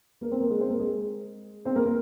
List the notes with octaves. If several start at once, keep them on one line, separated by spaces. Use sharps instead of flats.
A#3 A#4
C4 C5
A#3 A#4
G#3 G#4
C4 C5
A#3 A#4
G#3 G#4
C4 C5
A#3 A#4
A#3 A#4